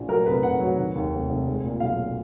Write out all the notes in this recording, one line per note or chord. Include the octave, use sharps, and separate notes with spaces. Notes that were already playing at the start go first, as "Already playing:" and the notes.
Already playing: A#1
F#3 A#4
F1 B4
F1 F#5
F#3
D#3
D#2
F1
F1
G#3
A#2
B1 F5